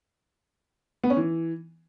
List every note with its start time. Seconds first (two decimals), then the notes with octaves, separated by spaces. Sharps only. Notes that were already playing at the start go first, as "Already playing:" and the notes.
1.04 B3
1.10 C#4
1.17 E3